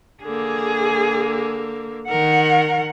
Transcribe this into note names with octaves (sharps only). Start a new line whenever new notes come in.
D3 A#3 G#4
D#3 A#4 F#5